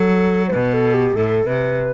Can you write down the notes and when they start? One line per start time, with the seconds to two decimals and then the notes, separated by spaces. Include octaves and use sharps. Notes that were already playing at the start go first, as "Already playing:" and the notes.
Already playing: F#3 A4
0.47 C5
0.52 B2 B4
0.74 A4
0.94 G4
1.16 A2 A4
1.47 C3 B4